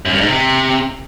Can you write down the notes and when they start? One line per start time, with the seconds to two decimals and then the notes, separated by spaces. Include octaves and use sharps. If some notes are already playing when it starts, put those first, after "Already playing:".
0.05 F#2
0.13 G2
0.21 G#2
0.29 C3